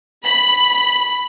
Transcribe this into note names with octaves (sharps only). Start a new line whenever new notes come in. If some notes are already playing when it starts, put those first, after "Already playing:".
B5